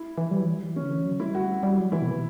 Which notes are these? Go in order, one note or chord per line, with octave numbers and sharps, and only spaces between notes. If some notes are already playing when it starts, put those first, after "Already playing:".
Already playing: E4
E3
G3
F#3
E3
C#4
C#3
D3
E3
F#3
G3 E4
F#4
G3
F#3
E3 E4
B2